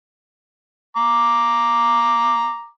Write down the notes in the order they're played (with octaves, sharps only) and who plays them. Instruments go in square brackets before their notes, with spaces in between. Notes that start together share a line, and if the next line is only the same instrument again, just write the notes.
[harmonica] A#5 D6